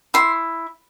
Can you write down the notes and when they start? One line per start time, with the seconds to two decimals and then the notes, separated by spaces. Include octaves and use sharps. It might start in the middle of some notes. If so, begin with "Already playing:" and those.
0.14 E4 C6